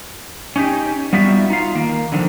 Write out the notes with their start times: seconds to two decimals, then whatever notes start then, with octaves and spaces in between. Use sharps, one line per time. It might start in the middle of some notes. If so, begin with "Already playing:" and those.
0.56 C#4 D#4 G4
1.13 G3 B3 D#4 F4 F#4 E5
1.50 D#4 F4 F5
1.75 D#3 A#3
2.12 D3 D#3 F3